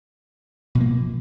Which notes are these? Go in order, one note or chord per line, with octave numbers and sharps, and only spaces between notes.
B2 F3 A#3